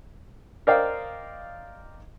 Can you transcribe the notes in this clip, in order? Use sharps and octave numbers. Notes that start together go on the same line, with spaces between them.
A#4 C5 D5 D#5 F5 G5